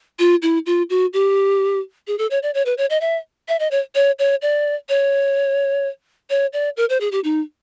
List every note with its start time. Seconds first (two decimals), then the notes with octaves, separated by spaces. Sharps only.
0.19 F4
0.42 E4
0.66 F4
0.90 F#4
1.13 G4
2.07 G#4
2.19 A4
2.31 C#5
2.43 D5
2.54 C#5
2.66 B4
2.78 C#5
2.90 D#5
3.01 E5
3.48 E5
3.60 D#5
3.71 C#5
3.95 C#5
4.19 C#5
4.42 D5
4.89 C#5
6.30 C#5
6.53 D5
6.77 A#4
6.89 C5
7.01 G#4
7.12 G4
7.24 D#4